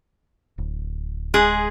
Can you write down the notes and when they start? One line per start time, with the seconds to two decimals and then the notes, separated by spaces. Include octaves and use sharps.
0.58 D1
1.34 G#3 G#4